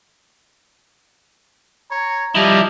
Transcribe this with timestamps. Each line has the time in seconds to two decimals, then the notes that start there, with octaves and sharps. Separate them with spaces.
1.91 C#5 A#5
2.35 F3 G3 E4 D#5